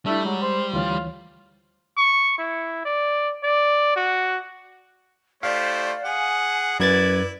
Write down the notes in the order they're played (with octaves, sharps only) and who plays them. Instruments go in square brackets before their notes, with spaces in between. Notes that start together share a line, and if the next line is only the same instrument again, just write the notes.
[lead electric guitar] G3 [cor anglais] A3 [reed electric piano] D4 E4
[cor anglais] F#3 [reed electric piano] G#3
[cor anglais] C5
[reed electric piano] D2 E3 C#5 [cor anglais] F4
[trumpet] C#6
E4
D5
D5
F#4
[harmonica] A3 E4 G4 [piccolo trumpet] C5 [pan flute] D5 [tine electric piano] F5
[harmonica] G#4 [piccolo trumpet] F#5 [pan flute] G#5
[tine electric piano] F#2 G#6 A6 [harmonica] E4 [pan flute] B4 [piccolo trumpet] D5